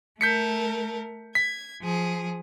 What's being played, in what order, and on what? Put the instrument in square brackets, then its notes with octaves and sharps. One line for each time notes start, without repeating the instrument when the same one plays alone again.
[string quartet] A3 A4 A#4 [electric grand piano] G6 B6 C#7
[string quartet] G#6 [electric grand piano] B6
[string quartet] F3 G#4